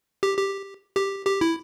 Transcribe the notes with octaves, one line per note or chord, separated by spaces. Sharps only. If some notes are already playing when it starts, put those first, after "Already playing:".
G4
G4
G4
G4
E4